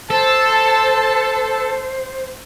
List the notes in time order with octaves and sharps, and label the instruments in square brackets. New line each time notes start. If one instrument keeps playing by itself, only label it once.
[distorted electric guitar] A4 [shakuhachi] C5 [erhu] A5